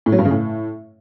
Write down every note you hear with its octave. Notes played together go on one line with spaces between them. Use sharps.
A2
F#3
G2
C#3
A2